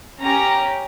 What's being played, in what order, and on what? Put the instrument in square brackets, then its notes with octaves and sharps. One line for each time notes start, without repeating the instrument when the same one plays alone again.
[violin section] C#4 G4 A#5